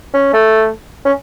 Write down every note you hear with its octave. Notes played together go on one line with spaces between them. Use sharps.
C#4
A3
C#4